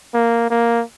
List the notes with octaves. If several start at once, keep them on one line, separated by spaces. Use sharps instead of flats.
A#3
A#3